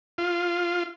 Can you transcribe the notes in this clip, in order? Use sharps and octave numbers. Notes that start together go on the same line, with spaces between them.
F4